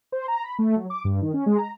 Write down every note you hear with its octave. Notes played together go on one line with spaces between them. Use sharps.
C5
A#5
B5
A3
F#3
D6
G2
D#3
C#4
G#3
A#5